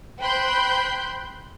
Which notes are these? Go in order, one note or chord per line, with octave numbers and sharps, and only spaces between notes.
C5 G5 B5 C6 F#6 G6